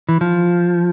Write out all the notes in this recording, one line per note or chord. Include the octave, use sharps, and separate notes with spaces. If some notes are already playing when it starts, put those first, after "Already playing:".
E3
F3